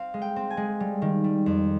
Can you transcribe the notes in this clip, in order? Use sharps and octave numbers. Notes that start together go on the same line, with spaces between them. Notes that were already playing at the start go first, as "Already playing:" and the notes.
Already playing: C4 F5
G#3
G5
C4
G#5
G#3
G3
D#3
G3
F2